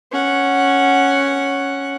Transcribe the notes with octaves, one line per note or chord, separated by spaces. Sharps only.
C#4 F#5